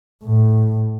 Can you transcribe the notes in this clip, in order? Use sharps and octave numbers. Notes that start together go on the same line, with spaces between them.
A2